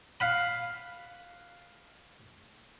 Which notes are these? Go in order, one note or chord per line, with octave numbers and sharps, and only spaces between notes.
F5 F#5 B5